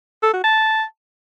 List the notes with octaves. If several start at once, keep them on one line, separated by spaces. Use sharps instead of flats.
A4
F#4
A5